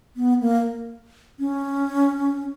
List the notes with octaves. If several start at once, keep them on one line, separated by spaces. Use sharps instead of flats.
B3
A#3
C#4